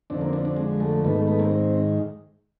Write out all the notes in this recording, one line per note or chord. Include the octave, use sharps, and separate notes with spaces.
F2 D3 C4 D4
A#3 C4
C4 D4
C4 D4
G#3
A3
G#2 D#3 A3 B3
A3
A3 B3
A#3 C4
C4